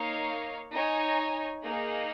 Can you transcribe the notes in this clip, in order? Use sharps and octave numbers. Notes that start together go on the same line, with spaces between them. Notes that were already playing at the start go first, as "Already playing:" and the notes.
Already playing: A#3 D#4 C#5 F5
D#4 C#5 G#5
A#3 D#4 G#4